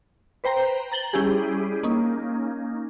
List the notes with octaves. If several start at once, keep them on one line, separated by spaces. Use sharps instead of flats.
B4 C5 G5 A#5
A#5 A6 F#7 G7
G3 C#4 E4 G4 G#4
A#3 C#4 D#4